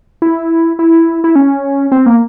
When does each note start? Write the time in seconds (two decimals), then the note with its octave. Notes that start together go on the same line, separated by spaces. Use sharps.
0.22 E4
0.79 E4
1.24 E4
1.36 C#4
1.92 C4
2.06 A#3